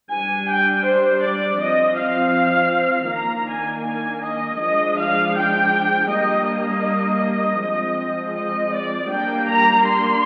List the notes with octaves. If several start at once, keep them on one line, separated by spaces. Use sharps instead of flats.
G3 D4 G#5
G5
C5
D5
F3 C4 D#5
F5
D#3 A#3 D4 A#5
G#5
G#5
D#5
F3 G#3 D4 D#5
F5
G5
G3 A#3 D4 D#5
D#5
F3 G#3 C4
D#5
D5
G3 A#3 D4 G5
A#5
C6